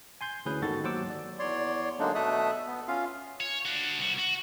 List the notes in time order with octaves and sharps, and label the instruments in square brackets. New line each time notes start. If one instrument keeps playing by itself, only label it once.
[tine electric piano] G#5 C6 G6 G#6
D2 E3 C#4 G#4 B4 G6
G1 G#2 D#3 F#4 A4 A6
D#2 F#3 C5 F#5 D6 E6
D5
[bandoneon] E2 C#5 D5 C6
D3 F#3 G#3 A#3 D4 D#4
B2 A3 A4 E5 D#6 F#6
B3
C#4 F4 F5
[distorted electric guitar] C#5
D4 F#4
C2 F#4
F#4